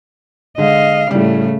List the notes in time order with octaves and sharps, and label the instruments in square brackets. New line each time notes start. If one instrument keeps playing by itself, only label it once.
[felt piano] D3 G#3 [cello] D#5 F5
[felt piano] A2 G3 [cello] C#3 A3